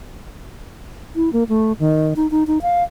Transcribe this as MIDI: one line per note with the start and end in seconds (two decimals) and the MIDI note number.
1.16 1.32 64
1.33 1.44 58
1.49 1.73 57
1.79 2.14 51
2.16 2.29 63
2.31 2.44 63
2.47 2.58 63
2.62 2.83 77